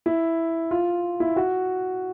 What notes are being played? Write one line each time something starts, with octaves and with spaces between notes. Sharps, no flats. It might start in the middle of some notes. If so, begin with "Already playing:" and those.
E4
F4
E4
F#4